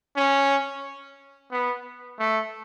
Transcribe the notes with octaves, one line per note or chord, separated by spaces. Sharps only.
C#4
B3
A3